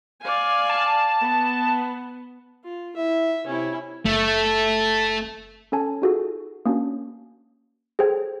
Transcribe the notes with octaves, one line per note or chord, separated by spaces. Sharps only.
D5 F5 G#5
A5
B3
F4
E4 E5
C3 C#4 E4
F#1 A3
C#4 A4 G#5 A5
D#4 F4 F#4 G#4 A4
A#3 C#4 D4 F#4
G#4 A4 C5 G5 G#6